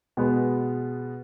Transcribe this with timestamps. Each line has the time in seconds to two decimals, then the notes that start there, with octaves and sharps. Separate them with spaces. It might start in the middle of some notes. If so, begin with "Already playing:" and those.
0.17 B2 G#3 B3